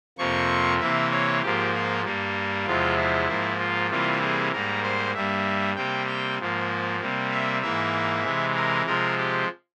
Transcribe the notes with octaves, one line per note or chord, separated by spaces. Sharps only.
F2 C3 F3 A#3 C#6
C3 E3 A#3 E5
C#5
G#2 F3 A#3 G4
F4
G2 G3 A#3
E2 C3 F3 G#3 F4
E4
G#2 F3 A#3
F4
C3 E3 G3 A#3 F4
G#4
G#2 G3 A#3 A#4
C5
G2 G3 A#3 E5
C3 G3 A#3 G5
G5
G#2 F3 A#3
C3 G3 A#3
E5
G#2 E3 A#3 E5
C3 E3 G#3
A#4
C3 F3 G#3 A#4
G4